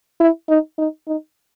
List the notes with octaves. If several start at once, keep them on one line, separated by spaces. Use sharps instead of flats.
E4
D#4
D#4
D#4